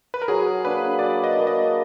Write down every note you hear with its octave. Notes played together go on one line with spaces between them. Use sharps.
B4
A#4
F#3 G#4
A#3 D4 B4
F#3 D5
D#5
A#3 D4
D#5